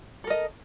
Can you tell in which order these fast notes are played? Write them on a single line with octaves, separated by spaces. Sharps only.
A4 A#4 D#5